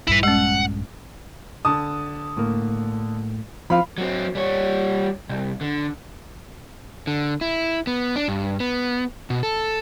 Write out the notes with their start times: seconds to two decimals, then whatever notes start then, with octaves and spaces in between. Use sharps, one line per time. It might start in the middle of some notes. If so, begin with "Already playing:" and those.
0.07 A#1 G2 E4 B4
0.23 G#3 C#4 F#5
1.65 D3 A5 D#6
2.37 A2 A#3
3.70 F3 C4 F4 F5 B5
3.98 F#3 C4
4.35 G3 C#5
5.29 C2
5.61 D3
7.07 D3
7.41 E4
7.87 B3
8.16 D4
8.28 G2
8.60 B3
9.30 B2
9.43 A4